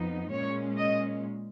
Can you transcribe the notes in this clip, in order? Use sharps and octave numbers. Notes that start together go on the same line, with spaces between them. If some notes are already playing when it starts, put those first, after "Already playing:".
Already playing: F2 F3 B3 D#4
A#2 G#3 C#4 C#5
D#5